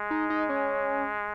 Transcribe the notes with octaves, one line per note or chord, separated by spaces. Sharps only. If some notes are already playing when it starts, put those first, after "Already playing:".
Already playing: G#3
D#4
D#4
C#4